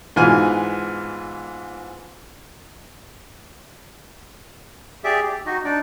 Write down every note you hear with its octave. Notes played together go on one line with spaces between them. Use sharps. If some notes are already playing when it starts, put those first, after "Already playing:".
G#2 B2 E3 F4 G#5 F6
G4 G#4 D5 E5
G4
D#4 F#4 D#5
D4 D#4 D5